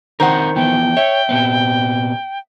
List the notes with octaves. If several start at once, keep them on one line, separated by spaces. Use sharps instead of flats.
D#3 C4 D4 A#4 C5 F#5
E3 F3 B3 G5
C#5 E5
A#2 B3 C4